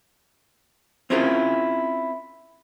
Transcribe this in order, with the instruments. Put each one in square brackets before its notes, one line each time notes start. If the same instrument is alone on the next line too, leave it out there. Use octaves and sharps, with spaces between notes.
[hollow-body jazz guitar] C4 C#4 E4 F4 G#4 A#4